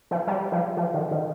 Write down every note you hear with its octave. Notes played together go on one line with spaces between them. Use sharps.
F3
G3
F3
F3
D#3
D#3